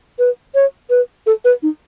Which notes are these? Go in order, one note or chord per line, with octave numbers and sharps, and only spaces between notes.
B4
C#5
B4
A4
B4
D#4